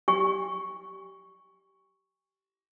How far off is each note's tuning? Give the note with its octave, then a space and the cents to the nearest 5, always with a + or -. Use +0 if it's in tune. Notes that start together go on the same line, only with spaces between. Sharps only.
G4 -20 G#5 -40 C#6 +0